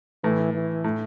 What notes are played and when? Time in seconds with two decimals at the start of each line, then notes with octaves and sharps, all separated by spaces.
0.24 A2 E3
0.54 E3
0.84 A2